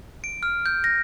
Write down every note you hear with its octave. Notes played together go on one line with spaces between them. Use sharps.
D7
F6
G6
A#6